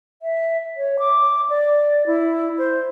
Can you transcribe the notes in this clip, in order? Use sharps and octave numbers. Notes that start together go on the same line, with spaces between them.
E5
C#5
D6
D5
E4
C5